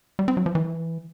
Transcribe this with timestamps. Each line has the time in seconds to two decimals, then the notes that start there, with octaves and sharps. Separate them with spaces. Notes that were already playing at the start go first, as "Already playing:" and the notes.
0.19 G3
0.28 C4
0.37 F#3
0.46 F3
0.55 E3